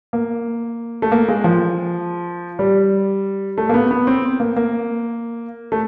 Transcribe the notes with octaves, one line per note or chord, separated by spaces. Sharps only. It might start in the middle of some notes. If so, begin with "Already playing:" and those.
A#3
A3
A#3
G#3
F3
G3
A3
A#3
B3
B3
C4
A#3
A#3
A3